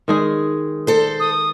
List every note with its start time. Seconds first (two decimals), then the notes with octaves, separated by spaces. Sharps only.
0.08 D#3 G#3 G#4
0.87 A4 C5
1.20 D#6